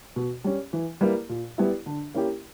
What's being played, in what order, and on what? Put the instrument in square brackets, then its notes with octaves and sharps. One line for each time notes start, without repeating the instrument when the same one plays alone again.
[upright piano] B2
G3 C#4
E3
G3 A#3 E4 B4
A#2
G3 B3 E4
D3
A#3 C#4 E4 G4